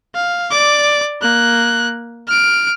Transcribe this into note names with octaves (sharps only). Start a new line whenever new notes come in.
F5
D5 D6
A#3 F#6
F6 D7